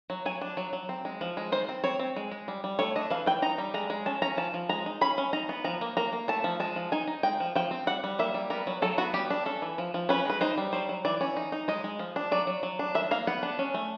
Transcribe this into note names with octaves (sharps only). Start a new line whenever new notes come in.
F#3
F#3 G#5
D4
F#3
F#3
C4
G#3
F3
G#3
D#3 C5
C4
C4 C#5
C4
G#3
G#3
G3
G3
A3 C#5
D4 D#5
E3 F5
E3 G5
D#4 A#5
G3
G#3 A#5
G#3
C#4 A5
C#4 A#5
F3 A5
F3
G#3 A#5
D#4
C#4 B5
C#4
D#4 A#5
B3
F3 A#5
A#3
A#3 A#5
A#3
A3 A5
F3
G#3 A5
F3
D#4 G#5
D#4
G#3 G5
F3
F3 G5
C4
G3 F#5
G3
A#3 E5
G3
B3 A#4
F#3
F#3 A4
B3 F#4
G3 G4
D4
C#4 A4
E3
F3
F3
C#4 B4
G#3 B4
D#4 C5
G3
F#3 C5
F#3
E3 D5
C#4
D#4
D#4
G#3 D#5
G#3
F3
D4
F#3 D5
F#3
F#3
D4
D#3 E5
A#3 F5
B3 F#5
D4
C#4
A3